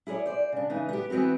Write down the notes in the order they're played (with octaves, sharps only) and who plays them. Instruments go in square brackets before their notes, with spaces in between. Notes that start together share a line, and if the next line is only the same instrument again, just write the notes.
[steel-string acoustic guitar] E4 G#4 A#4 C#5 D5
C5 D5
C#3 D4
C#3 E3 D#4
B3 G4
E3 B3 C4 F#4 B4